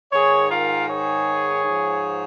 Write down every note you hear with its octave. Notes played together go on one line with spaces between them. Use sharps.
G#2 D#3 G#4 C#5
F4 A#4
G#4 C#5
G#2 F3